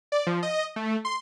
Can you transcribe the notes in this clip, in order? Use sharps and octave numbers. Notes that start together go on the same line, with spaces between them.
D5
F3
D#5
A3
C6